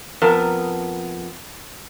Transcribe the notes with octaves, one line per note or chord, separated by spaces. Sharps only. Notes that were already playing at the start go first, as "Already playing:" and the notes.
F2 B3 A#4 A5